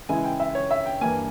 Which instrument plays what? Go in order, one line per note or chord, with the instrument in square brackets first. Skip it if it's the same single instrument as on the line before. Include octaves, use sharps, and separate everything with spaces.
[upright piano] C#3 E3 G#3 E4 G#5
G5
E5
C#5
E5
G5
G2 E3 A#3 G#5